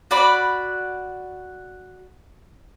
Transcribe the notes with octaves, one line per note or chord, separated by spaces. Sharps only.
F#4 D5 B5